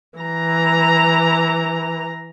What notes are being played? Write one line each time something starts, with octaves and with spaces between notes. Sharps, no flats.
E3 A#5